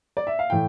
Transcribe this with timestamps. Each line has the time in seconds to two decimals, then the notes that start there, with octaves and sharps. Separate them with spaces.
0.17 D5
0.27 E5
0.39 F5
0.50 A2 E3 G5